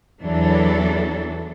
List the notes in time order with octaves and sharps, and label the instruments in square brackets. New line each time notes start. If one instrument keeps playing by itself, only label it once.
[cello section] E2 E3 F#3 D4 A4